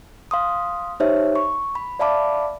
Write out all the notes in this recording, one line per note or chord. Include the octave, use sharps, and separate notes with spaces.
F5 C6 D#6
D#4 G4 C5 C#5 E5
C#6
B5
D5 E5 F5 A5 B5 D6